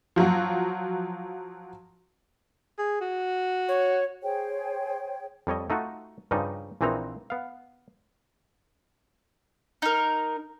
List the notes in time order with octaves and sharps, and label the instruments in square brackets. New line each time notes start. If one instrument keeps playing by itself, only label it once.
[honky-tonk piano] F3 F#3 F4 F#4
[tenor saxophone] G#4
F#4
[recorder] C#5
[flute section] G#4 C5 C#5 G5
[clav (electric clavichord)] F2 G3 C#5 D#5
A3 D#4 F4 F#4
G2 C#3 F3 G3 D#4
A#1 A#2 E3 C4 D#4 A#5
B3 F5
[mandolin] D#4 A#4